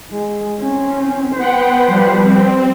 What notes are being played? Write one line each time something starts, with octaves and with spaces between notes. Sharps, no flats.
G#3
C4 C#4
B3 B4 C5 F#5 G5
F3 G3
C4